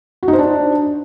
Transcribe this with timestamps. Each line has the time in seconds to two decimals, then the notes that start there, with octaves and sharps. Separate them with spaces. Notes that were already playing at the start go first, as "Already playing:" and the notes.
0.23 F#4
0.28 D#4
0.33 C5
0.39 D4